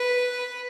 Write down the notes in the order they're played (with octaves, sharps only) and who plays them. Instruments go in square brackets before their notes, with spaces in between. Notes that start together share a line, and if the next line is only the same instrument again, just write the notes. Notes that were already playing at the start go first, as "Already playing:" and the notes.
Already playing: [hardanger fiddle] B4